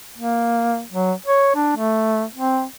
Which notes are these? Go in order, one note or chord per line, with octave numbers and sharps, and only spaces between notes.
A#3
F#3
C#5
D4
A3
C4